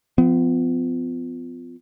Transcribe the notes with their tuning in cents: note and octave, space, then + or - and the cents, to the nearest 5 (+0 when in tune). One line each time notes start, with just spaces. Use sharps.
F3 +0 B3 +45